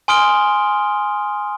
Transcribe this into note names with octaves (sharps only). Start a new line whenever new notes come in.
G#5 C6 D#6 F6 D7 G7